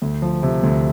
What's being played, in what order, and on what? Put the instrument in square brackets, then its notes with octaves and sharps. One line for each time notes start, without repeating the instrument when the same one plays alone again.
[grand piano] D2
F3
C3
D2